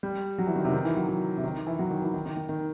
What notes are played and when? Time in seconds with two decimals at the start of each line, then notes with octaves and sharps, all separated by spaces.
0.03 G3
0.38 F#3
0.47 E3
0.56 D#3
0.65 C3
0.73 D#3
0.85 E3
0.97 F#3
1.08 F#3
1.37 C3
1.43 D#3
1.67 E3
1.79 F#3
1.90 D#3
2.02 E3
2.14 D#3
2.26 D#3
2.37 D#3
2.49 D#3